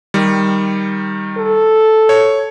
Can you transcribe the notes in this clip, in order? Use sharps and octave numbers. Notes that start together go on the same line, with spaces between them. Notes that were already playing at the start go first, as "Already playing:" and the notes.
D#3 G3
A4
C#5